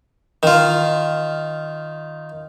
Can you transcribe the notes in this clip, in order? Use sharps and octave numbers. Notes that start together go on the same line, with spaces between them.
D#3 F4